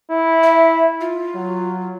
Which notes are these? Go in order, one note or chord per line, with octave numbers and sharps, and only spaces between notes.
E4
E5
F4
F#3